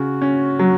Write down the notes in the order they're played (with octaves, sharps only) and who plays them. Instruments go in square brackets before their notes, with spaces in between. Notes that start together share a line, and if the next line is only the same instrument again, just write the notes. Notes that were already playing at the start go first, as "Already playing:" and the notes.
Already playing: [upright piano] C#3 [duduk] F#4
[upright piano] C#4
F#3